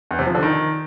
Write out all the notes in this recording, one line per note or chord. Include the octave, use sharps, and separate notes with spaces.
E2
C3
F3
D3
D#3